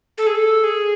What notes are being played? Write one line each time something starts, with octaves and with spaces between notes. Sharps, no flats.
A4
G#4
A4
G#4